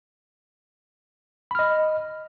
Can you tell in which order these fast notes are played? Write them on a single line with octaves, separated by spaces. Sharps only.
B5 F6 D#5